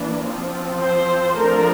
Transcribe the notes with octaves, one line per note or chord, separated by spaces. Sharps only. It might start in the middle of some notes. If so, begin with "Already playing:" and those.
Already playing: E3 A#3 D4
F3 C4
C5
F3 A3 D4 A#4